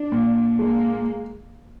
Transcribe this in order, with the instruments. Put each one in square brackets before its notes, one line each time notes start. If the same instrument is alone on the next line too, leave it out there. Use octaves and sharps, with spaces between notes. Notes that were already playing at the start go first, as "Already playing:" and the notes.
Already playing: [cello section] D4
[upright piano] A#2
[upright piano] G#3 [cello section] A#3